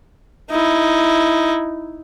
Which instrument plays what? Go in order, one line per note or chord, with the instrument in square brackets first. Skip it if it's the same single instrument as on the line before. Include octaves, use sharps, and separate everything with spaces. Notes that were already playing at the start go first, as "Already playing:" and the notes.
[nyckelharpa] D#4 E4